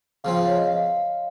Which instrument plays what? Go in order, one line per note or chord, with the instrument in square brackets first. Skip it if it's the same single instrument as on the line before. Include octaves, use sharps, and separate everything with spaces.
[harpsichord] C#3 F3 C4 [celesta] F5
[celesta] F5
C#5
D#5
F5